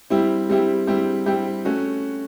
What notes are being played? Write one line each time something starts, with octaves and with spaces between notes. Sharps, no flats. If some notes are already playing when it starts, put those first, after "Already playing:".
G3 C4 E4 G4
G3 C4 E4 G4
G3 C4 E4 G4
G3 C4 E4 G4
A3 C#4 F#4